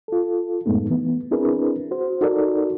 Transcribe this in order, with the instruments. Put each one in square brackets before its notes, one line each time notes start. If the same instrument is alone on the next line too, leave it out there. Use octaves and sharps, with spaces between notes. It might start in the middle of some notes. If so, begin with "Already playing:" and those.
[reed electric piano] F4 A4
F#2 A2 G#3 A3 B3 D#4
E3 B3
C4 D4 E4 G#4 A#4 B4
F#4 C5
D#4 F#4 A4 A#4 D5